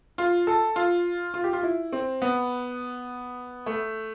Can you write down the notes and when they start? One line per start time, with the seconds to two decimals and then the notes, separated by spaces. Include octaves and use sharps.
0.18 F4
0.47 A4
0.76 F4
1.34 F4
1.44 G4
1.53 F4
1.63 E4
1.93 C4
2.22 B3
3.66 A3